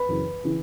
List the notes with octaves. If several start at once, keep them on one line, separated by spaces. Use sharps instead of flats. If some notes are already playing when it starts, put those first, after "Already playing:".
Already playing: B4 B5
F#2 C#3 E3
C#3 E3